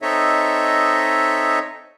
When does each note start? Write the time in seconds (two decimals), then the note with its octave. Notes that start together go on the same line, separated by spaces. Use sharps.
0.02 C4 D#4 A4 C#5 D#5 E5